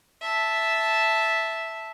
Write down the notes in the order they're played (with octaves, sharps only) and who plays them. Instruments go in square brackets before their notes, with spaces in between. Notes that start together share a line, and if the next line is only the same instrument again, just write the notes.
[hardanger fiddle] E5 A5